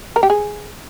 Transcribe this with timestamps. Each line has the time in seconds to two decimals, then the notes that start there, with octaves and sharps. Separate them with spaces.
0.16 A#4
0.23 G4
0.30 G#4